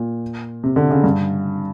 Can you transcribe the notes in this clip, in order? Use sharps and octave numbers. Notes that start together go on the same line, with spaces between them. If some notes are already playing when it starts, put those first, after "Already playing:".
Already playing: A#2
C3
D3
C#3
G2